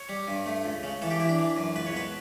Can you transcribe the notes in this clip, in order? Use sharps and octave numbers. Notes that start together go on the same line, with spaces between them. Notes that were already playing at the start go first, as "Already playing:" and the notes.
Already playing: C#5
G3
G2
A3
C#2
C#3
E3 A4
G4
E3 E4
D4
E3
F#2
C#2 B4
C#5
B2 B4